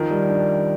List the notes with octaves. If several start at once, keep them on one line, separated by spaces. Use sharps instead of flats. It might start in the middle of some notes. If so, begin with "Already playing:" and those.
Already playing: D#3 F3
G3
D4